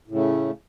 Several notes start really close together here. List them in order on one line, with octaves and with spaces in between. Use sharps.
A2 C#3 A3